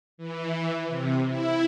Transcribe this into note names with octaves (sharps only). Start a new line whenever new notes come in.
E3
C3
E4